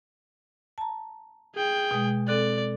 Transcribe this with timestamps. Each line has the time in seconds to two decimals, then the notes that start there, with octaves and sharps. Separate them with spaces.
0.78 A5 A#5
1.55 G#4 G5
1.91 B2 G#3
2.28 C4 A4 D5 F#6